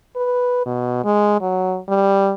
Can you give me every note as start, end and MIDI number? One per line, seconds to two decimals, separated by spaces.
0.16 0.66 71
0.66 1.03 47
1.04 1.39 56
1.41 1.79 54
1.89 2.34 55